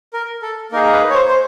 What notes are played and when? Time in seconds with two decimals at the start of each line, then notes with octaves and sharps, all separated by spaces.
0.13 A#4
0.42 A4
0.72 A#3 D#4 G#4 A#4
0.93 B4
1.10 C#5
1.14 C5
1.28 C5